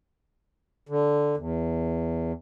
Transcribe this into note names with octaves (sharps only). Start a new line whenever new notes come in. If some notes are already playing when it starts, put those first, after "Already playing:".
D3
E2